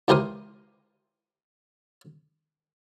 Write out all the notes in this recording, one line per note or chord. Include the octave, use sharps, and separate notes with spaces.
C#2 E3 G4 A#4 C5 D#6